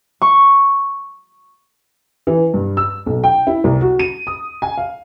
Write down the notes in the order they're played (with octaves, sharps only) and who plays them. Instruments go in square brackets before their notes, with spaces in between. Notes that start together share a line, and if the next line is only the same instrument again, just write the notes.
[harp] C#6
[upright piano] E3
G2
E6
B1
G5
E4
C2
F#4
D#7
D#6
G#5
F5